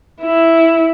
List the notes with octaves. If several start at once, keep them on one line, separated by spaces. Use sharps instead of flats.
E4